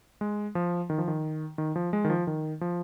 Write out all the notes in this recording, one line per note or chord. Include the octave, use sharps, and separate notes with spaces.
G#3
F3
D#3
F3
D#3
D#3
F3
G#3
D#3
F3
D#3
F3